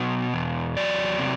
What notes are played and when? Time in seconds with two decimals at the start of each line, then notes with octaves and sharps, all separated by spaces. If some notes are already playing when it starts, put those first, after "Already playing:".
Already playing: B2 F#3
0.34 E2
0.77 F#3 D5
1.19 C3